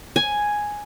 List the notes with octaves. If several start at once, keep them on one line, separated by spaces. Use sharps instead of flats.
G#5